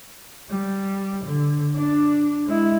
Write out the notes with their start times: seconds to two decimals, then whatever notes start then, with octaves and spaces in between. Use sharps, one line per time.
0.49 G3
1.25 D3
1.76 D4
2.46 G#3 E4